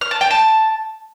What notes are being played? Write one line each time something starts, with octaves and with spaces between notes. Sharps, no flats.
F6
A5
G5
A5